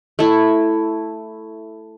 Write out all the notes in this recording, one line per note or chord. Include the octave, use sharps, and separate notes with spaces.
A3 E4